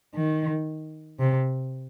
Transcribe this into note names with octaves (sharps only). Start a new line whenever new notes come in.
D#3
C3